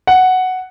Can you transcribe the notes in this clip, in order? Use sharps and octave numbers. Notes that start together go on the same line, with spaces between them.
F#5